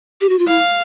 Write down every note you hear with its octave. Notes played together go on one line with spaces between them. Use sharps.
G4
F#4
F4
E4 F5